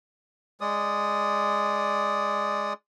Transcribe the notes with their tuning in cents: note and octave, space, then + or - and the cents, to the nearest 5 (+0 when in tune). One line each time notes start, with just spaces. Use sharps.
G#3 +0 D5 +0 D#6 +0